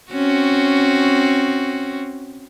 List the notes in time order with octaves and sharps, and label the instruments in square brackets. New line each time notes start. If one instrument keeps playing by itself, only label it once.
[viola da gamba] C4 C#4 F#4